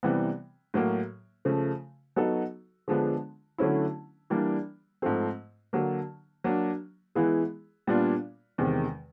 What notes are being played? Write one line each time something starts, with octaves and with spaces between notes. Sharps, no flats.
C3 E3 G3 B3
A2 F#3 A#3
C#3 F3 A3
F#3 B3 D#4 F#4 A4
D3 F3 G#3 B3 D4
D3 F#3 A3 C#4 E4
E3 G3 A#3 D4
G#2 F3 A3 C4
D3 F#3 A#3
F#3 A#3 D4
E3 G#3 B3 E4 G#4
A#2 G3 B3 D4 F4
E2 C3 D#3 G#3